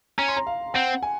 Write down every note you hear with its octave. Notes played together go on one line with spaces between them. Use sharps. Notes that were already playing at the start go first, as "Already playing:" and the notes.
C#4 A#5
C6
A#5
F5
C4 F#5
G#5